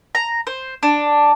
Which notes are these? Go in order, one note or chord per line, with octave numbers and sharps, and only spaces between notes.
A#5
C5
D4